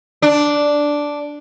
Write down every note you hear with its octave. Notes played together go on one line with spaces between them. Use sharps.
D4